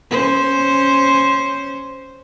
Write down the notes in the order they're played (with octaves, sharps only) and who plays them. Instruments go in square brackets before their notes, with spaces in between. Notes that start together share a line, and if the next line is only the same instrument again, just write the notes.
[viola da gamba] C#4 C5